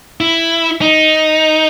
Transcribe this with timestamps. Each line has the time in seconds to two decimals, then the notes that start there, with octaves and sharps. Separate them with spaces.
0.20 E4
0.81 D#4